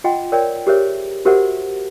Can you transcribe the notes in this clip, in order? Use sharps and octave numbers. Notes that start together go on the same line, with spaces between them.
F4 D#5 F#5 G5 C6
A#4 C#5 D5 G5
G4 G#4 A#4 C5 C#5 E5
F#4 G4 A#4 C5 E5 F#5